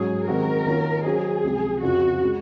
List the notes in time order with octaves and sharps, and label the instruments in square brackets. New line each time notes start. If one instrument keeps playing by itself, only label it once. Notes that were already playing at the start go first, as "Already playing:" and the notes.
Already playing: [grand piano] G#2 F#3 C#4 [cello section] G#4
[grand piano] D#3 G#3 C4 F#4 [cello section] A#4
[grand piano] D#3 A#3 C#4 F4
[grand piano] F#3 C#4 F#4 C5 [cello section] G#4
[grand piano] C#2 C3 F3 G#3
[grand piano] F2 C#3 F3 C4 F4 [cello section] F#4
[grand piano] C#3 G#3